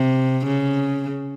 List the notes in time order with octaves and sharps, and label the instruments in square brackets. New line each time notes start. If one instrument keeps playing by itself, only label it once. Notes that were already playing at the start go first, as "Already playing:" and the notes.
Already playing: [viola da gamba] C3
C#3